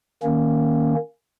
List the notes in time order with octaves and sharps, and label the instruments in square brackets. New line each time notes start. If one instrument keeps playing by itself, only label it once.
[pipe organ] D#3 A#3 C#4